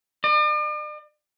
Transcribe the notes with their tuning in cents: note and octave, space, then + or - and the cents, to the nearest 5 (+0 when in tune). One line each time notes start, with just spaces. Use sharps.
D5 +45